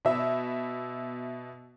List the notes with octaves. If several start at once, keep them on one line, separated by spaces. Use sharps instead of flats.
B2 E5